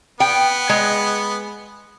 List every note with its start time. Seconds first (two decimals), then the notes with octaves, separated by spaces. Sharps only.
0.20 B3 G5
0.69 G#3